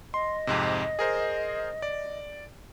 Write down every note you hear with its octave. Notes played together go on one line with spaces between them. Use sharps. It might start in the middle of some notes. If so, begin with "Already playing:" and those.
D#5 C6
F2 G#2 C3
G#4 A#4 C5
D5